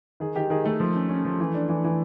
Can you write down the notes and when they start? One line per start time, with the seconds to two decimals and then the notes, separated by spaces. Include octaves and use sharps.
0.20 D#3 G#4
0.36 D#3 G4
0.50 D#3 G#4
0.65 D#3 A3 A4
0.80 F3
0.95 C#4
1.09 C#4
1.25 F3
1.40 E3
1.54 D4
1.69 E3
1.84 E3